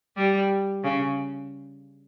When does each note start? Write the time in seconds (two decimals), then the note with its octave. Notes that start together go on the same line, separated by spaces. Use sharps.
0.16 G3
0.84 C#3